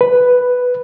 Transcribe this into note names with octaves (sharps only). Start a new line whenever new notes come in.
B4